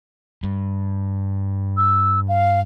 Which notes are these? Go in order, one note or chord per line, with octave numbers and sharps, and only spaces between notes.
G2
E6
F5